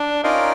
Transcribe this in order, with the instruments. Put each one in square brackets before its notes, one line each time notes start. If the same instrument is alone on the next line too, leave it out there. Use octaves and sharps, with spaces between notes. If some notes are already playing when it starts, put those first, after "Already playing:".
Already playing: [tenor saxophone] D4
[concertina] C#4 F4 A#4 D5 F5 [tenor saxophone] D#4